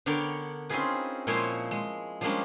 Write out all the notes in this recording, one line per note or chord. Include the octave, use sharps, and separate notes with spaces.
D3 B3 D4 A#4 C#5 G5
C4 C#4 D#4 F4 G#4 B4
A#2 F3 G#3 E4 C5 C#5
G#3
F3 G3 G#3 A#3 C#4 D4